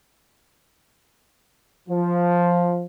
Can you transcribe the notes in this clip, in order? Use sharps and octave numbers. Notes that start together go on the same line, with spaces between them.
F3